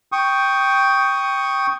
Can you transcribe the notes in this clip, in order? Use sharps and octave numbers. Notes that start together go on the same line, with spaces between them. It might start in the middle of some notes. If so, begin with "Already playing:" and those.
G5 C#6 D#6